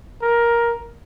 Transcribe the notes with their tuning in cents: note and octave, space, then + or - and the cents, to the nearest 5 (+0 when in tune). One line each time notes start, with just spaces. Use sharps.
A#4 +10